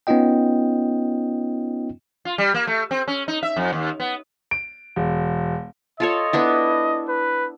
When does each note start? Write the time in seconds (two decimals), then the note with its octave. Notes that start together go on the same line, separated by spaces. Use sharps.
0.07 B3 C#4 D#4 F4 D#5 G5
2.25 F4
2.38 G3
2.54 A#3
2.67 A3
2.91 C4
3.08 C#4
3.28 D#4
3.43 E5
3.56 F2
3.73 D#2
4.00 B3
4.51 D7
4.96 E1
6.00 F4 A4 C#5 D#5
6.33 B3 D4 E4
7.09 B4